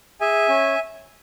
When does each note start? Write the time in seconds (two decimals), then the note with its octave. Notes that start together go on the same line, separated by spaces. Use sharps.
0.21 G#4 E5 G#5
0.49 C#4